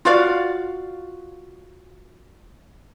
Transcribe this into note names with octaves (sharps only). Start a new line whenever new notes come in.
F4 F#4 D5 F5